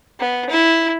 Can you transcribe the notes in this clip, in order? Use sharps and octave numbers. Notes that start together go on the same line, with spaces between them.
B3
E4